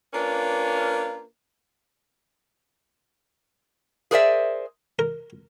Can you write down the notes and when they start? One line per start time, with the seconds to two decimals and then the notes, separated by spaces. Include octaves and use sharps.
0.13 A#3 C#4 D4 F4 B4
4.11 G#4 A#4 C5 D5 E5
4.99 A#4